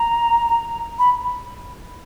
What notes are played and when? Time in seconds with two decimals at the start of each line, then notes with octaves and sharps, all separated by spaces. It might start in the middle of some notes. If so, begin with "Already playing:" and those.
Already playing: A#5
0.99 B5